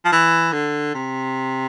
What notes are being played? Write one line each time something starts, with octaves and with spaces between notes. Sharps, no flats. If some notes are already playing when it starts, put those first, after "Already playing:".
F3
E3
D3
C3